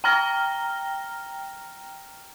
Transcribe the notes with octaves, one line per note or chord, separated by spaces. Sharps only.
G5 A#5 F6 A#6 G7